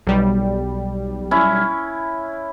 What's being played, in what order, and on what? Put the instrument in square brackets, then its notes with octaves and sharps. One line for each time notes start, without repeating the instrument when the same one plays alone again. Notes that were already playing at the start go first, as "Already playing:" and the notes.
[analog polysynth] B1 G3
[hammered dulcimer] C#4 E4